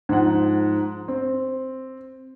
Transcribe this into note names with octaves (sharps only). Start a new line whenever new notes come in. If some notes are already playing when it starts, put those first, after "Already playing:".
G#2 F3 F#5
C4